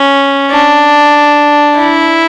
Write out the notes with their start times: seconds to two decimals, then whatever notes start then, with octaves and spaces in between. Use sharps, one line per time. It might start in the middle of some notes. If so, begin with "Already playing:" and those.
Already playing: C#4
0.51 D4
1.77 E4